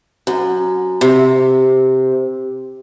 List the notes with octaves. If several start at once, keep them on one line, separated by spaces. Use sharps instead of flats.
F#2
C3